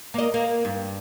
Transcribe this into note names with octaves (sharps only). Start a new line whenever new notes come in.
A#3 D#5
A#3
G2